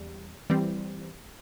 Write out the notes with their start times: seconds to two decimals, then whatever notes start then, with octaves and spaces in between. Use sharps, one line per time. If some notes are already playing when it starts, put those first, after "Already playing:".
Already playing: E2 G3
0.50 E3 G3 C4